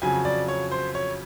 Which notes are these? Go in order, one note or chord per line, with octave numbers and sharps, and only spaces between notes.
F2 C#3 F#3 G#5
D5
C#5
C5
C#5